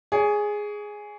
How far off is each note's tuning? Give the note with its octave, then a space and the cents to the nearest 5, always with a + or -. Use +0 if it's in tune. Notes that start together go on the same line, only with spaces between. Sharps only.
G#4 +0 C#5 +40